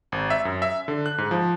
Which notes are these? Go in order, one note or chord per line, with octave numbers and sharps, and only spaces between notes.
G#1
E5
F#2
E5
D3
F#6
G#2
F3